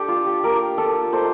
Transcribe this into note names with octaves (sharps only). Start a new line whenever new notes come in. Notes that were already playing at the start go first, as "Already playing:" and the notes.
Already playing: A3 D4 G4 A4
F4
G4
A#3 F4 G4 A#4
F4 A4
A3 D#4 A4 C5